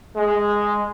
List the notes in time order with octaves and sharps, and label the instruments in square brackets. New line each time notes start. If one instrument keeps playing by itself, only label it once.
[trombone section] G#3